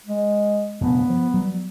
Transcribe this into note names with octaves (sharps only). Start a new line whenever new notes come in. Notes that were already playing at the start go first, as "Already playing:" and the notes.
G#3
F1 G2 A#2 B3
F3
F#3 G3